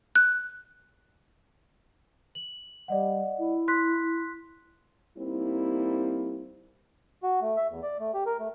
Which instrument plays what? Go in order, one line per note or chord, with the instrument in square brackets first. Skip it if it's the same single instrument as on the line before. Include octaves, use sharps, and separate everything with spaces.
[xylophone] F#6
[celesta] F#7
[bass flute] G3 [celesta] D5 D#5 F#5
[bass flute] E4
[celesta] C6 F#6 B6
[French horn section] G3 A#3 C4 D#4 E4
[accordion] F#4
A3
E5
E2
D5
A3
G4
A#4
A3